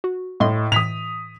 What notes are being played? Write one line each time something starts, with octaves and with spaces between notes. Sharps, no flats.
F#4
A2 D#5 C6
A2 E3 D#6 B6 F7